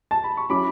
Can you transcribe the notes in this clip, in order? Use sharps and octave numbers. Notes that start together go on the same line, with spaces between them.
A5
B5
C#6
F#3 C#4 E4 B5 D6